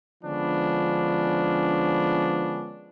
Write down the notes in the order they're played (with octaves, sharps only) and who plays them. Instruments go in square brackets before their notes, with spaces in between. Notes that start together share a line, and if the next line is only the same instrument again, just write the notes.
[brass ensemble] D3 F3 G#3 B3 C#4 D4